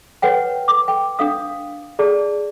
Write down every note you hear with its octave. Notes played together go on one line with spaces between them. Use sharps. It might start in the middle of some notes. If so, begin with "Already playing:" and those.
B4 C#5 F#5 G5
D6
G5
D4 F5 D#6
G#4 D5 A5